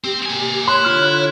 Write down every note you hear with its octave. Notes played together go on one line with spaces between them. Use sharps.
C4 G4
A#3 G#5
E4 C#5 C6 F#6
D3 F4 F6